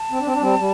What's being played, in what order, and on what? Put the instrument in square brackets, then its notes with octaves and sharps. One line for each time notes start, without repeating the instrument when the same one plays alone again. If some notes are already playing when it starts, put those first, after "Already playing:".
Already playing: [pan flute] A5
[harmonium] C4
D4
C4
D4
G3 C4
G3